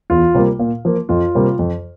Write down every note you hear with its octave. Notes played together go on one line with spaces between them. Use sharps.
E2 F4
C3 G3 A#3
A#2
F3 A#3
F2 F4
C3 G3 A#3
F2